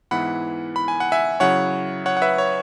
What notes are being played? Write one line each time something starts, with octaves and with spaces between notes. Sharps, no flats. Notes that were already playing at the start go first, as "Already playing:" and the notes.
G#2 E3 B3 E4 F#5 B5
B5
G#5
F#5
E5 G#5
C#3 F#3 E4 C#5 F#5
C#5 F#5
F#5
B4 E5
C#5